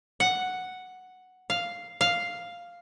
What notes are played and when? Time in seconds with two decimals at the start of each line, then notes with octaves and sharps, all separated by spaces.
0.20 F#5
1.50 F5
2.01 F5